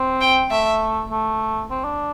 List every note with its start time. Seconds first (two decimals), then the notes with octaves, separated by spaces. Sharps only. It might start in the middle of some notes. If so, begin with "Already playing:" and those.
Already playing: C4
0.21 G5
0.51 A3 E5
1.10 A3
1.70 C4
1.84 D4